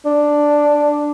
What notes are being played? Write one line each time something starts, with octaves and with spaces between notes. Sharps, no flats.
D4